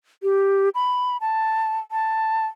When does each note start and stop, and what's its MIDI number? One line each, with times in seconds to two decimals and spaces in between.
0.23 0.69 67
0.75 1.17 83
1.21 1.80 81
1.91 2.46 81